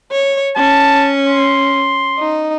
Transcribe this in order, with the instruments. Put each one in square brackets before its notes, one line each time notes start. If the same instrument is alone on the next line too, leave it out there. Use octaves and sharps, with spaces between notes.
[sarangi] C#5
[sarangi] C#4 [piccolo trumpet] A5
[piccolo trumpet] C6
[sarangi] D#4